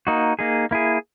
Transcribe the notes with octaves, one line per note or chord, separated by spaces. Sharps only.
A#3 D#4 F#4
A#3 D#4 G#4
A#3 E4 G#4